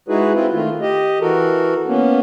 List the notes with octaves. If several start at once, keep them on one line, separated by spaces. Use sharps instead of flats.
G#3 D#4 E4 F#4 G#4 B4
C4 E4 F4 B4
D#3 A3 F4
G4 D#5
E3 F#4 A4 A#4
A#3 B3 C#4